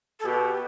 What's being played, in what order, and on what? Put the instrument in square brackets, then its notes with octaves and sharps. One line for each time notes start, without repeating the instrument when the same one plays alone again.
[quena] A4
[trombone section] B2 [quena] G4